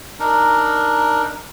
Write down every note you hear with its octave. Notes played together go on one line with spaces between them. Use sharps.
D4 D#4 A#4